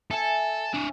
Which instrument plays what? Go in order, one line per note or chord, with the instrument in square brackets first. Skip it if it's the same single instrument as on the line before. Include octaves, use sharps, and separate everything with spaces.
[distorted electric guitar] A4 [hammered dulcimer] E5 G#5
[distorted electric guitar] D4 C#5